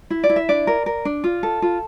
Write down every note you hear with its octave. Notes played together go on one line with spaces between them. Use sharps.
E4
D5
E4
E5
D4 D5
A#4
A#4
D4
F4
A4
F4